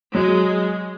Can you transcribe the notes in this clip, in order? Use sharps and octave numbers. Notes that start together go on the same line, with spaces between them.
F#3 G#3